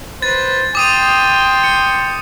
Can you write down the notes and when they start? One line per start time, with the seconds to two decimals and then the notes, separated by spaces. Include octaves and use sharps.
0.22 B4 C5 A6
0.75 G5 C6 D6 D#6 D#7
1.64 C#7